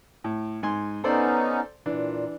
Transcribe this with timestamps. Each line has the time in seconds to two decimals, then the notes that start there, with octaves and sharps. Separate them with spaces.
0.24 A2
0.63 G#2 G#5 C6
1.04 B3 C#4 D#4 A4 C5 D5
1.86 A#2 E3 D4